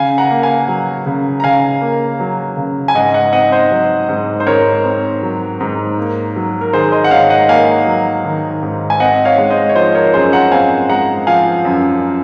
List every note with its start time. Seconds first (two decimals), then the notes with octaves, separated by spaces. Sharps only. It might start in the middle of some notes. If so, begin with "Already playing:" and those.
Already playing: C#3 F5 G#5
0.18 F#5 A#5
0.31 A#3
0.43 F5 G#5
0.68 F#3
1.06 C#3
1.40 A#5
1.44 C#3 F5 G#5
1.81 A#3
2.20 F#3
2.57 C#3
2.88 G#5
2.95 G#2 D#5 F#5
3.14 D#5 F#5
3.33 C4 D#5 F#5
3.52 C5 D#5
3.71 F#3
4.09 G#2
4.40 C5
4.46 G#2 A#4 C#5
4.85 C4
5.22 F#3
5.61 G#2
5.98 A#3
6.36 F#3
6.61 A#4
6.73 D#3 G#4 C5
6.92 C5 D#5
7.04 F#5
7.11 G#2 C#5 F5
7.30 D#5 F#5
7.49 A#3 F5 G#5
7.86 F#3
8.25 D#3
8.63 G#2
8.90 G#5
9.00 C4 D#5 F#5
9.25 C#5 F5
9.38 G#3
9.50 C5 D#5
9.69 C#5
9.76 F3 C5 D#5
9.95 A#4 C#5
10.14 F#2 G#4 C5
10.32 F#5 A#5
10.52 C4 F5 G#5
10.90 G#3 F#5 A#5
11.27 F3 F5 G#5
11.65 F#2